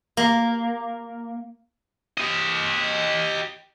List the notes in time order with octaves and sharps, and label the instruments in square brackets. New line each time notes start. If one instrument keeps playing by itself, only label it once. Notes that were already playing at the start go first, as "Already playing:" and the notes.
[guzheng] A#3
[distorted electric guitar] G4 D#5